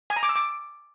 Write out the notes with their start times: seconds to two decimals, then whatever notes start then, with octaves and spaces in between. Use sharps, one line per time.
0.10 G#5
0.16 A#5
0.23 D6
0.29 E6
0.36 D6